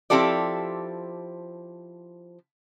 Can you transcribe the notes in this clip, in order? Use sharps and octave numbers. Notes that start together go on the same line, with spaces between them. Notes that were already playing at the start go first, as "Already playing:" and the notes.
F3 C4 E4 G4 A4 D5